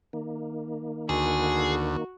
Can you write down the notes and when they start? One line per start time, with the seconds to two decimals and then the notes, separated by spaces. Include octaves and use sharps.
0.13 D#3 A#3
1.09 D2 F#4 G#4